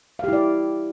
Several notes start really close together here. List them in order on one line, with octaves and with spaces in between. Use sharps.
F5 G4 E4 D5